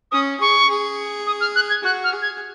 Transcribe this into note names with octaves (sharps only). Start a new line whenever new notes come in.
C#4 D#6
G#4 C#6
G#4
D#6
F6
F#6
G#6
F#4 F#6
F6
G#4
G#6